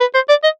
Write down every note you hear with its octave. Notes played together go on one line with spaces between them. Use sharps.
B4
C5
D5
D#5